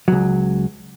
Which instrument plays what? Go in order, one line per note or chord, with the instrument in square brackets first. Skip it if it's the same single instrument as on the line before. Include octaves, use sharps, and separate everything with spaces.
[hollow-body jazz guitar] C#2 F#3